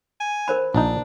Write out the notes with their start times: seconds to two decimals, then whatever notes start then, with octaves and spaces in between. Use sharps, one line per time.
0.20 G#5
0.48 A#4 C5 B5
0.74 A#1 D4 D#4